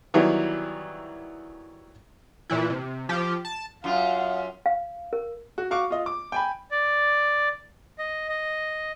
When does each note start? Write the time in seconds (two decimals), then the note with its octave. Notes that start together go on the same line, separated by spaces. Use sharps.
0.14 D#3 E3 F#3 G3 B3 E4
2.50 A#2 E3 E4
2.70 C3
3.09 F3 G4
3.45 A5
3.84 F#2 F4 F5 F#5
4.66 F5
5.13 A#4
5.58 F#4
5.71 F#4 F5 C#6 D6
5.90 F4 D#5
6.06 D6
6.32 G5 G#5 B5
6.71 D5
7.99 D#5
8.28 D#5